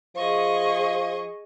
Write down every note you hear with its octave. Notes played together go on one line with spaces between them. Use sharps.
F3 G#4 D#5 C#6